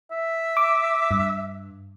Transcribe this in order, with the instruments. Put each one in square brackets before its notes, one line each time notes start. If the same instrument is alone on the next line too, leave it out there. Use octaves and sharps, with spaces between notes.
[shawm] E5
[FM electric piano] D6
G2